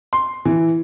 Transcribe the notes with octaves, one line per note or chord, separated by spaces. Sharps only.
C6
E3